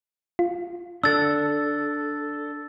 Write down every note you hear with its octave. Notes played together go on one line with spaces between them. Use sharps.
F4
D4 A4 E6 A6